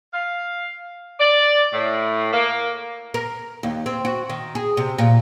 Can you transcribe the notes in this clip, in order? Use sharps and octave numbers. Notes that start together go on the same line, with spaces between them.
F5
D5
A2
A#3
A#4
D#2
C4
F#4
D#3
G#4
C3
A#2